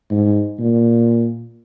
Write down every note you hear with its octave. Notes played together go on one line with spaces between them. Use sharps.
G#2
A#2